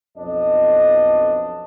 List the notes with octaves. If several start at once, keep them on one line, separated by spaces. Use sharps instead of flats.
B1 F2 D4 D#5